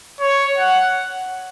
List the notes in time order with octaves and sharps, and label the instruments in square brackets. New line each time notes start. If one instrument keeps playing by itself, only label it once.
[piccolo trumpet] C#5
F#5